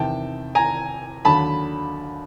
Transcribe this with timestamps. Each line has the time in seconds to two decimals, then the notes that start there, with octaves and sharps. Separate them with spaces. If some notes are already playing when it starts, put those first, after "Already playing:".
Already playing: E2 C3 D#3 G5 A5
0.55 G#5 A#5
1.25 D#2 D3 F#3 A5 B5